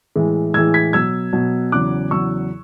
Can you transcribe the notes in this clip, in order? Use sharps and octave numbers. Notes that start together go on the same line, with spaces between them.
A2 E3 G#3
A2 E3 G#3 E6 G#6
G#6 B6
B2 F#3 E6 G#6
B2 F#3
E2 C#3 F#3 D6 F#6
E2 C#3 F#3 C#6 E6